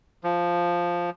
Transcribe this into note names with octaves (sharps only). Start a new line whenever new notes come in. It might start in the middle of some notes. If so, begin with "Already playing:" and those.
F3